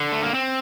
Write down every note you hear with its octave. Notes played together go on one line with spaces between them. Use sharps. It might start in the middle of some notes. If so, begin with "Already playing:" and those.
Already playing: D3
A3
A#3
C4